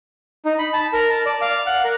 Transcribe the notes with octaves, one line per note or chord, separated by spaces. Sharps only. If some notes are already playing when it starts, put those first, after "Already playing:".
D#4
B5
A5
A#4
A5
D5
F5
F#5
A#4